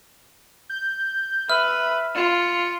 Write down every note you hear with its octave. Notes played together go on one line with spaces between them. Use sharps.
G6
B4 E5 F6
F4 C#7